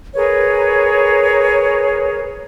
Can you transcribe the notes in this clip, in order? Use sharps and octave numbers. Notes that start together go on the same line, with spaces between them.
G#4 A#4 B4 C#5